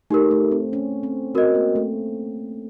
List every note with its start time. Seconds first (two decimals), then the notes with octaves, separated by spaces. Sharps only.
0.10 A3 D#4 G4 A#4
0.31 A3
0.52 C4
0.73 C#4
1.03 C4
1.35 C4 F#4 A#4 D#5
1.55 A#3
1.76 A3